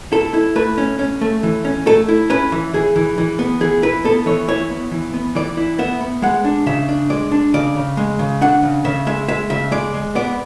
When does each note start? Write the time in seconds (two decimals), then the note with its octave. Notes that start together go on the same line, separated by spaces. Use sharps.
0.12 E4 A4
0.34 E4
0.56 A3 B4
0.78 C#4
0.99 C#4
1.21 A3
1.43 E3
1.65 C#4
1.86 A3 A4
2.08 E4
2.30 C#4 B4
2.52 E3
2.73 E3 G#4
2.96 E3
3.18 E3
3.39 B3
3.61 E3 G#4
3.83 E4 B4
4.04 B3 A4
4.26 E3 C#5
4.48 E4 C#5
4.70 B3
4.91 E3
5.14 B3
5.35 E3 D5
5.57 E4
5.79 B3 E5
6.01 B3
6.22 G#3 F#5
6.45 D4
6.66 C#3 E5
6.89 D4
7.10 G#3 D5
7.32 D4
7.54 C#3 D5
7.76 C#3
7.97 G#3
8.19 C#3
8.41 D4 F#5
8.63 C#3
8.84 C#3 E5
9.07 G#3 E5
9.28 G#3 E5
9.50 C#3 E5
9.71 G#3 D5
9.94 G#3
10.15 B3 D5